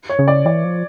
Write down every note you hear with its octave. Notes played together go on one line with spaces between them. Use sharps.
C#5
C#3
D5
E3 D5
F3